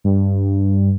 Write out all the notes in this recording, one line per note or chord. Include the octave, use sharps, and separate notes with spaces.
G2